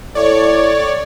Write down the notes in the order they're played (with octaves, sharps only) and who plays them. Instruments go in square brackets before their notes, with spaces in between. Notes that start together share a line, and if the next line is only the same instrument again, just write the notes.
[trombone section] A2 [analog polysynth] C#5 D5